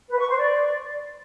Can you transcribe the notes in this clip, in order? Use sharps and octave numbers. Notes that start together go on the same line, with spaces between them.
B4
C#6
C5
D5